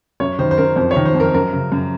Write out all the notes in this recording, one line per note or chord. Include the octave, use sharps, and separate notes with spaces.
F#2 C#5
D#3 C5
C5
F#2 A#4
F2 C5
C#5
D#3
C5
F2
A#4
F#2 A#4
C#3
F#2